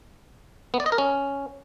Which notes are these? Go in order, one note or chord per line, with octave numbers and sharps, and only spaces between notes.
B3
D5
D#5
A#4
C#4